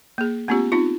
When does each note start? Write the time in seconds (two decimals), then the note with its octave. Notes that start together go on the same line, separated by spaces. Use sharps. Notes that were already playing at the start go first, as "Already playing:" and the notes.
0.18 A#3 G#4
0.48 A3 B3 C#4 F4 G4
0.72 C4 D#4 F4